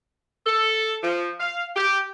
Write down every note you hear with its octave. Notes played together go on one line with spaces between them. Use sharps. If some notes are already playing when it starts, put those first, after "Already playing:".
A4
F3
F5
G4